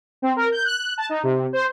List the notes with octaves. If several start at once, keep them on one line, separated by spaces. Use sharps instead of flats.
C4
A#4
G6
F#6
A5
D#4
C3
C5